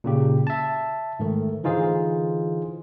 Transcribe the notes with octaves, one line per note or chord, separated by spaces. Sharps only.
A#2 C#3 G4
E5 A5
G#2 D#3 A3
D3 E3 D#4 F4 G#4 C5